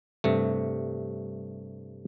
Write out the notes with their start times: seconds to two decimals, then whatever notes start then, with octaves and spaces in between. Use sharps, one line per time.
0.24 G2 C3 A3